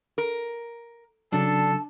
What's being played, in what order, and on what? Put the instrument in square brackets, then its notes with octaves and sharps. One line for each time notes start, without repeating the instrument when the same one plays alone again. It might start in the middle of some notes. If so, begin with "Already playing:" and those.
[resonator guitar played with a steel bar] A#4
[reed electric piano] C#3 F#3 [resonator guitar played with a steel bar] D4 [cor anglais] A4 [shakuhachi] A5